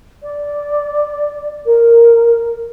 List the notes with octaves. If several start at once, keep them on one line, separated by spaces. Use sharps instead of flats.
D5
A#4